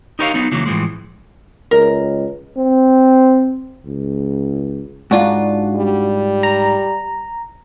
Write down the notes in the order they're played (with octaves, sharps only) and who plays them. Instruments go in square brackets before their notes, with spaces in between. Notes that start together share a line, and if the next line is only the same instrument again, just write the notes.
[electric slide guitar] D#4 G4 A#4 C#5 D#5 F5
F#3 B3 D#4
C#3 E3 F#3 A#3
A2 E3 F3 G#3
[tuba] C#2 [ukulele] A#4
[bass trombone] C4
C#2
[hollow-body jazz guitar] G#2 F4 [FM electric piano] D4 F#4
[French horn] G3
[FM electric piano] A#5